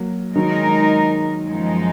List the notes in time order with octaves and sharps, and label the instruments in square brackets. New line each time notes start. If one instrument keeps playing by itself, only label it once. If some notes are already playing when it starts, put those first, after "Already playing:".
Already playing: [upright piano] F#3 A#3
[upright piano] D#3 F#3 [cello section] G#3 D#4 A#4
[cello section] F#2 F3 G#3 D#4